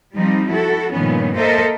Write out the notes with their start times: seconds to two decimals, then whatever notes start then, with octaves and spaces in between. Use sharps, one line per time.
0.15 F3 G3 C4 D#4
0.48 E4 F#4 A4
0.92 G2 A#2 D#3 F3 B3 C#4
1.35 A#3 A4 A#4 C5 D#5 E5